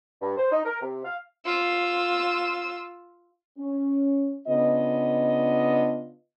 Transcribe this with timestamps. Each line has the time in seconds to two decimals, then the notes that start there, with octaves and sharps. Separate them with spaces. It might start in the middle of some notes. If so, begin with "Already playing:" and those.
0.21 G2
0.37 C5
0.51 D#4
0.65 A#4
0.82 C3
1.05 F5
1.45 F4 E6
3.58 C#4
4.47 C#3 B3 D4 F4 D#5